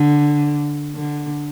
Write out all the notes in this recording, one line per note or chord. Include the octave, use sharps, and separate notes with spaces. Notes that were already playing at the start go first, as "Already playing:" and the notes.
Already playing: D3
D3